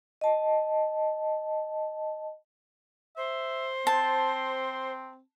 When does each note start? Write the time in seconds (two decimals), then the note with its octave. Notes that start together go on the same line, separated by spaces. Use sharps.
0.21 D#5 A5
3.17 C5 E5
3.87 C4 A5